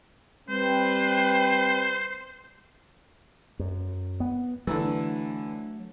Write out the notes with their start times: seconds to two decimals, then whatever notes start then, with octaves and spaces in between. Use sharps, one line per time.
0.49 G3 C4 B4 C5
3.59 F#2
4.20 B3
4.67 D3 E3 F#3 A3